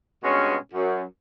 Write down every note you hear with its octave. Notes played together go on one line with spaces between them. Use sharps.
G2 B2 G#3 C#4
F#2